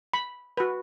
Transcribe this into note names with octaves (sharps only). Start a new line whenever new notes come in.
B5
F#4 B4